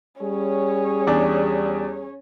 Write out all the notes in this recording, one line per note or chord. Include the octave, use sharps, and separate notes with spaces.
G3 C#4 G#4 C#5
E2 D4